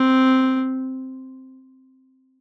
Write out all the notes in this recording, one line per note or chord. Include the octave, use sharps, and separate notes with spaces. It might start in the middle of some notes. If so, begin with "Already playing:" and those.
Already playing: C4